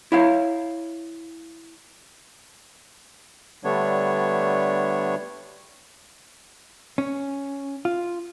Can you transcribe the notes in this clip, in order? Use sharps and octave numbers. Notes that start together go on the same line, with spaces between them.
E4 C#5 F5
D3 G3 A3 B3 D4 C#5
C#4
F4